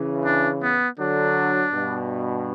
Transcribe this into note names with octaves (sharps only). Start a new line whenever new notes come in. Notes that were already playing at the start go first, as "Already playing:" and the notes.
Already playing: C#3 E3
D4
B3
D3 F#3 D4
G2 B2